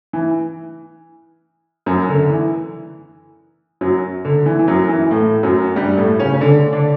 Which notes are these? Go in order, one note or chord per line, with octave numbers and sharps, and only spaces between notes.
E3
F#2 F#3
D3
E3
F#2 F#3
D3
E3
E3
F#2 F#3
E3
A2 A3
F#2 F#3
G2 G3
A2 A3
C#3 C#4
C#4
D3 D4
D3 D4